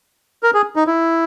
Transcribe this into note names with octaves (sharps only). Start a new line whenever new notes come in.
A#4
G#4
D#4
E4